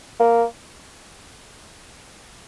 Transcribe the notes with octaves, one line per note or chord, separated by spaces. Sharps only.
A#3